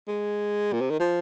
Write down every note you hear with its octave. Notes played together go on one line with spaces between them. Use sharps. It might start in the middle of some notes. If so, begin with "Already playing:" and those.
G#3
A#2
C3
D#3
F3